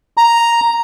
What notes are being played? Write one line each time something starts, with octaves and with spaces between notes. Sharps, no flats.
A#5